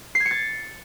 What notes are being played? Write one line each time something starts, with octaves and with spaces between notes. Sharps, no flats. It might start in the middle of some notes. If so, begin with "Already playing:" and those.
C7
G#6
C#7
A6